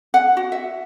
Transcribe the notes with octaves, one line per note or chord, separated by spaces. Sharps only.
F#5
F#4
E5